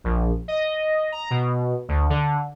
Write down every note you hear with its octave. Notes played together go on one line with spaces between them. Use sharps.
A#1
D#5
A#5
B2
D2
D3